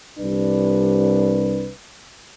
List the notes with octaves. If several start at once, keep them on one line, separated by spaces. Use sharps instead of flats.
C2 G3 D4 B4